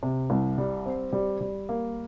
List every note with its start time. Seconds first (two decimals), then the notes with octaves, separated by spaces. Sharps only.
0.03 C3
0.30 C2
0.58 G3
0.86 C4
1.12 G3
1.41 G3
1.69 A#3